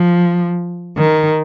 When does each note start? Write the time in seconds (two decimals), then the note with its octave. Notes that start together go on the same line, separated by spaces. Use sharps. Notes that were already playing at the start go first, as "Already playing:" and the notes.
Already playing: F3
0.98 D#3